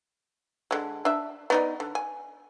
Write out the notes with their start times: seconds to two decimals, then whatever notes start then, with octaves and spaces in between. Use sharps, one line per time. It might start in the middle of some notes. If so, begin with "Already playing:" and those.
0.71 D3 G#3
1.05 D4 E5
1.50 B3 D#4 D5
1.80 D3
1.95 G#5